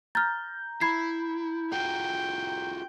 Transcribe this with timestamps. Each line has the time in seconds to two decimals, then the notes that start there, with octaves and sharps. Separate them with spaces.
0.15 A#5 F6 G6 A6
0.81 E4 B5 G#6 C7
1.72 F4 F#4 G#4 G5